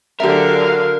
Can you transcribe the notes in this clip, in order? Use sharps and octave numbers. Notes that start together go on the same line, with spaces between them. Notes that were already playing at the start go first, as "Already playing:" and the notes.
D3 F#3 G4 A#4 E5 F5